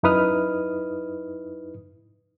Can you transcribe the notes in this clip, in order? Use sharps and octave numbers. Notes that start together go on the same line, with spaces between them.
F#2 D#4 E4 B4 D#6 F6